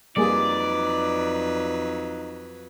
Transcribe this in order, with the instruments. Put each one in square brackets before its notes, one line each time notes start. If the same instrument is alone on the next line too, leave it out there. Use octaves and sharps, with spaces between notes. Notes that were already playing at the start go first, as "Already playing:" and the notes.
[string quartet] F2 F#3 B4 [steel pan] G3 A#3 G#4 [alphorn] D#4 [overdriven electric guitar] D5